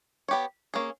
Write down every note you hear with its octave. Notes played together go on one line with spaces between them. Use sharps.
B3 G4 C#5
A#3 C#4 G#4